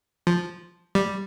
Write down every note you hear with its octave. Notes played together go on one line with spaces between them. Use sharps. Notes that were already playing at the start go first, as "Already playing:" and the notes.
F3
G3